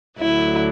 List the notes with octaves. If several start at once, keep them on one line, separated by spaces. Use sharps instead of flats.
D2 D3 F#3 E4